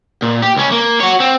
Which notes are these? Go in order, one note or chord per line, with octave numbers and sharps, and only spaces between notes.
A#2
G4
C#2 C#4
A#3
F#4 C#5
C4